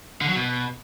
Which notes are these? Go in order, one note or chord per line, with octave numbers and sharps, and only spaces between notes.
D3
F#3
B2